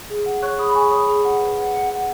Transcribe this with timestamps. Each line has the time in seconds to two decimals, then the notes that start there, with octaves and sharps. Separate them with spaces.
0.10 G#4
0.26 F#5
0.42 C#5 C#6 F#6
0.59 G#4 B5 D#6
0.69 B5
0.75 G#4 G#5 C#6
0.91 C#5 B5 D#6
1.08 G#4
1.25 F#5
1.40 B4
1.58 F#5
1.74 F#5
1.90 F#5